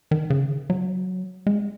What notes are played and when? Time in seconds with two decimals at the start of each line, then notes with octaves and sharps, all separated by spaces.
0.11 D#3
0.30 C#3
0.70 F#3
1.47 G#3